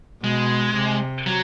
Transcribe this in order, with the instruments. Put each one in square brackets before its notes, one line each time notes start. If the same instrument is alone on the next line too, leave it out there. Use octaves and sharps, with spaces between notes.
[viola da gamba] B2 [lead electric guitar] G#3
[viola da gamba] C3
[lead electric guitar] F#3